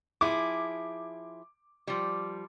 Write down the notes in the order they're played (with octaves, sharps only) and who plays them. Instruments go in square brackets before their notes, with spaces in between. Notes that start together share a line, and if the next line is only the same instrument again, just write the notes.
[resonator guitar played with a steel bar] F3 E4 G#4 [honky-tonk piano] D6
[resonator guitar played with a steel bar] F3 G3